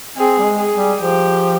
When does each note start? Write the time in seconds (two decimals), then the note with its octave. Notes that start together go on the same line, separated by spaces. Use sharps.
0.18 C4 G#4
0.39 G3
0.45 G#3
0.59 G#4
0.74 G3
1.00 F3 G4